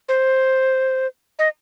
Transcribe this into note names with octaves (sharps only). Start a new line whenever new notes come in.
C5
D#5